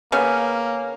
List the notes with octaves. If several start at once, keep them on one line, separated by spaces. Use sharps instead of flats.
C#3 A#3 B3 C#4